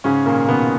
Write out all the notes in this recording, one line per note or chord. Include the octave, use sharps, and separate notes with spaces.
G#2 C#3 C#4
A#2 D#3 A#3
B2 D#3 B3